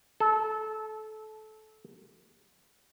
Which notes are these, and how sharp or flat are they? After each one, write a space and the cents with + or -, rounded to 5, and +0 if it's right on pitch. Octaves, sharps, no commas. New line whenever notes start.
A4 -20